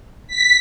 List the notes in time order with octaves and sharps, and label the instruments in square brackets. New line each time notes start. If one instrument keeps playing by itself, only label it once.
[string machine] B6